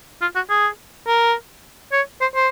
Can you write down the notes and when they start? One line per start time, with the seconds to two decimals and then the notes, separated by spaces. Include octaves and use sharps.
0.21 F4
0.36 F#4
0.50 G#4
1.07 A#4
1.93 C#5
2.21 C5
2.35 C5